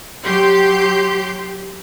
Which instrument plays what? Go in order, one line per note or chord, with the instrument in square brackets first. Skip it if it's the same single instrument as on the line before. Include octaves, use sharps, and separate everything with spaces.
[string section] F#3 G4 C6 G6